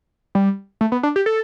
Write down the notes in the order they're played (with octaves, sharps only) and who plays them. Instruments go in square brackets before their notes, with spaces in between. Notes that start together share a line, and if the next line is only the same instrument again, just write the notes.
[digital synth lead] G3
A3
B3
D4
G4
A4